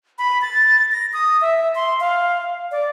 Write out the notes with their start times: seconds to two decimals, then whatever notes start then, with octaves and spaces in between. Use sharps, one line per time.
0.18 B5
0.42 A6
0.92 A#6
1.13 D#6
1.42 E5
1.75 C6
2.00 F5
2.71 D5